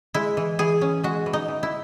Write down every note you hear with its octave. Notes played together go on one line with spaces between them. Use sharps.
G#3 E4
E3
E3 G#4
C#4
G#3 F#4
E3
D#4
E3
E4